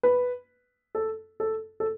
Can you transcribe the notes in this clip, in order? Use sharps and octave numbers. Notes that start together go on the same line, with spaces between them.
B4
A4
A4
A4